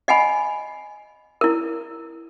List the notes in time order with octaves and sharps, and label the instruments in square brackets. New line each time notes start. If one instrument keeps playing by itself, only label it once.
[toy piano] D#5 F#5 G#5 B5
E4 A#4